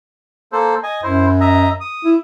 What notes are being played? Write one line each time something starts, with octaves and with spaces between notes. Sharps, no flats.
A#3 A4 C5
D#5 G#5
F#2 E4 C5
D#5 E5 A#5
D#6
E4